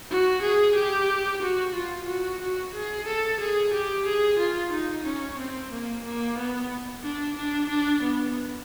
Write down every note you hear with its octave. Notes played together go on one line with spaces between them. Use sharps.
F#4
G#4
G4
F#4
F4
F#4
F#4
G#4
A4
G#4
G4
G#4
F4
D#4
C#4
C4
A#3
A#3
B3
D4
D4
D4
B3